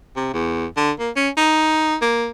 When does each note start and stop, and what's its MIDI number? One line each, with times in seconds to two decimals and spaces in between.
0.16 0.31 48
0.33 0.66 40
0.77 0.91 50
0.99 1.10 58
1.16 1.29 61
1.37 1.96 63
2.01 2.29 58